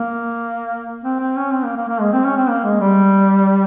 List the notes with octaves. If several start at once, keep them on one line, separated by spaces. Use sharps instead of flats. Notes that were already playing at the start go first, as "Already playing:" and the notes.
Already playing: A#3
C4
C4
C#4
C4
A#3
A#3
A#3
G#3
C4
C#4
C4
A#3
G#3
G3